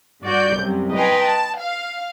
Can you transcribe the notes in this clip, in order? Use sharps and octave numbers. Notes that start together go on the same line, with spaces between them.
G2 F#4 D5 G6
C2 F#2 C3
B4 D#5 G5 G#5 A#5 C6
A5
F5